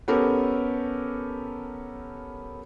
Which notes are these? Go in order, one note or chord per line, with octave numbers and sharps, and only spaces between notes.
B3 C#4 G4 A4 A#4